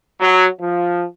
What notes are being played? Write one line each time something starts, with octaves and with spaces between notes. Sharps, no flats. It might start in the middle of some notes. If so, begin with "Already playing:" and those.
F#3
F3